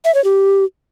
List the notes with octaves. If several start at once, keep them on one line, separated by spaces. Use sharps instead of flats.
E5
C#5
G4